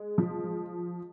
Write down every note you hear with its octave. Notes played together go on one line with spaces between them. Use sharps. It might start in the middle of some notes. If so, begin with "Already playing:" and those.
Already playing: G#3
F3